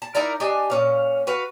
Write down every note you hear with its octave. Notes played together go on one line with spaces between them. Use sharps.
A5
D#4 E4 A#4 D5
D4 G4 D#5 G#5
A#2 C#4 F5
F#4 B4 F5